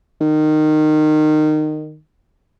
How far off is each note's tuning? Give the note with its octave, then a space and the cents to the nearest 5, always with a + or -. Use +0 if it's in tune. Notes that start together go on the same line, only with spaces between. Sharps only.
D#3 -20